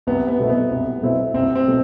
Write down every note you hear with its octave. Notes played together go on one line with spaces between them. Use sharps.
C2 B3
B3
B2 A3 C4 E4
B3
C2
B2 A3 C4 E4
C2 C4
C4
B2 A3